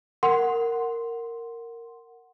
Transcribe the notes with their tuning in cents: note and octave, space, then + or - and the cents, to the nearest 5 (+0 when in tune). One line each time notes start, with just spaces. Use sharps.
A#4 -10 F#5 +0 C6 +0